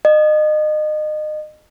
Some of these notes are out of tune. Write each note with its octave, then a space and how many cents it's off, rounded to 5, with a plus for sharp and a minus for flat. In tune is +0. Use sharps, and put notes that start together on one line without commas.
D#5 -30